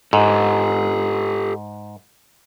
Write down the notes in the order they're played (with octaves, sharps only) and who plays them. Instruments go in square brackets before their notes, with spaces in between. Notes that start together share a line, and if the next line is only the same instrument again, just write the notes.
[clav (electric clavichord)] G#2 [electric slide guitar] G4 A4